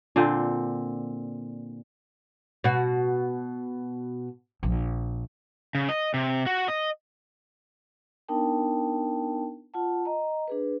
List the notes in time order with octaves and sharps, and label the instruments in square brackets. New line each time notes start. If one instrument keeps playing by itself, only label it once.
[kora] A#2 D3 C4
[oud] B2 F#4
[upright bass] A#1
[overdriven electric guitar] C#3
D#5
C3
F#4
D#5
[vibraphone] B3 D4 D#4 A#4 G5 A5
F4 F#5 A5
D#5 A#5
D4 G#4 B4